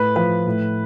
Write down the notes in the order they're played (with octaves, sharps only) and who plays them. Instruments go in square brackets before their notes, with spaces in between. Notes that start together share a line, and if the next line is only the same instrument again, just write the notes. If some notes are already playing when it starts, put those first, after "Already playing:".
Already playing: [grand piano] A2 B4
F3 B4
A2